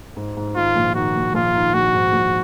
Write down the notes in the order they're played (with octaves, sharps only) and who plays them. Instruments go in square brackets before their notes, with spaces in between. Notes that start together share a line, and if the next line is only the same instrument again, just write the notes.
[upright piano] G#2
G#2
[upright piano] D#3 [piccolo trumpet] F4
[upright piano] A#1
[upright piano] D#3 [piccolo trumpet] F#4
[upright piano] A#1
[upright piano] A#1 [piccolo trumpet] F4
[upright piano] D#3
[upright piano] A#1 [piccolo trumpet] F#4
[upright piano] G#2
A#1